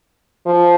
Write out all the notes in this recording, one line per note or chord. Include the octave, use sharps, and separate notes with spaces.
F3